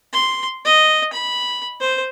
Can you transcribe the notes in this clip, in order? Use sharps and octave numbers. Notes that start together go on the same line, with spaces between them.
C6
D#5
B5
C5